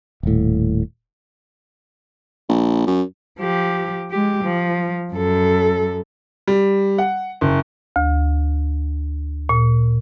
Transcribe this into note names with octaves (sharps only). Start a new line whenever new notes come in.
D#1 A2
A#1
F#2
F3 G4
G#3 G4
F3
F#2 A4
G3
F#5
F#1
D2
A#2